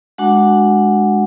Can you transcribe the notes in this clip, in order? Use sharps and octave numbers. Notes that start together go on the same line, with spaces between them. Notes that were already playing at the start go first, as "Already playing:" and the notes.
G#3 D4 F#4 F#5